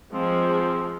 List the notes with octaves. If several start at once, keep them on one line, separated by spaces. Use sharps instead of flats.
F3 G#3 C4